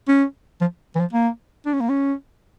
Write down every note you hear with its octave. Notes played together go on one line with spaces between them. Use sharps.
C#4
F3
E3
F3
A#3
D4
C#4
A#3
C#4